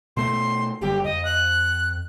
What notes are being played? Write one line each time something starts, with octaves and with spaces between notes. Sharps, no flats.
B2 A3 C6
F#1 D3 G3 G4
F2 D#5
F#6